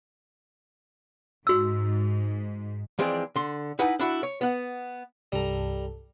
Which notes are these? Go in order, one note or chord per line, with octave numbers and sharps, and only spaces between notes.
G#2 F#4 E6
E3 F3 G#3 C4 G#4 D5
D3 C6
D#4 E4 B4 F#5 G#5
D4 E4 F#4
C#5
B3 F#5
C2 G2 G3 A4 A#5